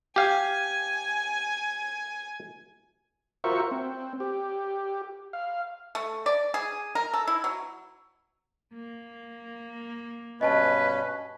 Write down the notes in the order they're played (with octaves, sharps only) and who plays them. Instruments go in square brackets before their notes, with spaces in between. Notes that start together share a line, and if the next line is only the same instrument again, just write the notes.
[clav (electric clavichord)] G4 F5 [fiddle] G#5
[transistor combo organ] F4 F#4 A#4 C5 E5 C#6
C4
G4
F5
[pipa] A3
D5
G#4
A#4
A4
E4
F#3
[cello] A#3
[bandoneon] G2 B2 C#4 [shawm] B4 [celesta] D#5 G#5 A5